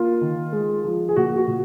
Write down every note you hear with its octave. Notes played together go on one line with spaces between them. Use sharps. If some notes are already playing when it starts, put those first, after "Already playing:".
Already playing: A#3 F4
D#3
G#3
F3
G#4
A#2 F#4
F#4
A#2